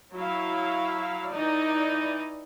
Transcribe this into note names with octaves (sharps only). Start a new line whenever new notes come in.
F#3 E4 F5
E3 D#4 D5